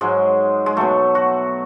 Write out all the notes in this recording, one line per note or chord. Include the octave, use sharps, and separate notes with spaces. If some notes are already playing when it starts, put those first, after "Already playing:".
G#2 F#3 G#3
G#3
B2 F#3 A3
F#4